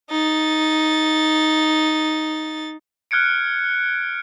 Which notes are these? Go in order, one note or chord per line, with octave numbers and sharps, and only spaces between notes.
D#4 A6
F6 F#6 G#6 C#7 D7